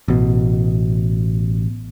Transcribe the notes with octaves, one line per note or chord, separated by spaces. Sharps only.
A1 B2